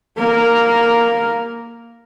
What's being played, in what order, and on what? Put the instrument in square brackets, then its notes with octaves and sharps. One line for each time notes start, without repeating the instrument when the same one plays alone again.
[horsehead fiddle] A#3 A#4